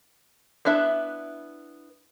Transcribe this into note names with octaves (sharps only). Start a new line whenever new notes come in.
B3 D4 E4 E5